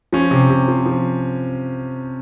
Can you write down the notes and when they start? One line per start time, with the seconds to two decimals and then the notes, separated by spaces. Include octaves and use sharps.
0.13 F3 C#4
0.31 C3
0.50 C3
0.68 F3
0.86 F3